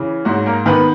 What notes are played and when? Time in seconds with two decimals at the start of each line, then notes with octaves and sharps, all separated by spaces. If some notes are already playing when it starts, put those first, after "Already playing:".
Already playing: C#3 E3
0.25 G#2 F#3 F#4
0.46 A#3 A#4
0.66 D#3 B3 B4